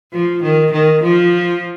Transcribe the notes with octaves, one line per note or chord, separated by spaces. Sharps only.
F3
D#3
D#3
F3